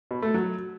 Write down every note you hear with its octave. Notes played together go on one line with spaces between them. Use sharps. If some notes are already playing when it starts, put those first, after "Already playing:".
B2
A3
F#3